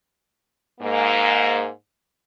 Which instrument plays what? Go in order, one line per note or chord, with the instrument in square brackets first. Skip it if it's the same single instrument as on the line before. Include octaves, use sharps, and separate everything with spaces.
[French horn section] G#2 A#3